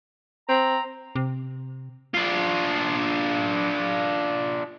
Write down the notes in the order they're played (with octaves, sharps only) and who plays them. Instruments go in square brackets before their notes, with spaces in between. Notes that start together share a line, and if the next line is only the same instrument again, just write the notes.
[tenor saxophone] C4 [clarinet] A#5
[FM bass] C3
[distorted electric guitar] D4 F4